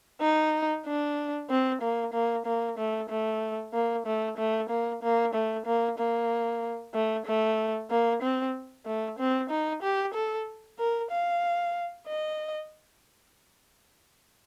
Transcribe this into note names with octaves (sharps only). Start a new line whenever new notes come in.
D#4
D4
C4
A#3
A#3
A#3
A3
A3
A#3
A3
A3
A#3
A#3
A3
A#3
A#3
A3
A3
A#3
C4
A3
C4
D#4
G4
A4
A#4
F5
D#5